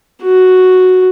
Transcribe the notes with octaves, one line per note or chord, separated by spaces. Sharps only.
F#4